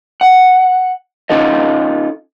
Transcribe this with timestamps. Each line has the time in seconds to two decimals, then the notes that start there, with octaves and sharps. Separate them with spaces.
0.21 F#5
1.30 C#4 D#4 F4 A4 D#5